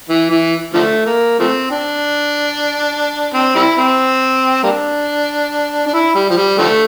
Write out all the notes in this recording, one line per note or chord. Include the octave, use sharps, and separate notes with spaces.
E3
E3
D3 F3 A3
A#3
F3 A3 C4
D4
C4
G3 C4 E4
C4
G3 A#3 D4
D4
E4
G3
F3
G3
D3 F3 A3